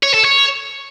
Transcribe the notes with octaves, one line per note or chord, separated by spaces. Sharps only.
C#5
A4
C#5